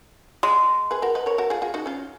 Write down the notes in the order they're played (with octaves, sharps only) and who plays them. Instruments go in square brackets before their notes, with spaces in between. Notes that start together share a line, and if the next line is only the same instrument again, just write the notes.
[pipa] G#3
[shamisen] G#4 B4
F#4 A#4
B4 D#5
A#4 C#5
F#4 A#4
F4 G#4
F4 G#4
D#4 F#4
C#4 F4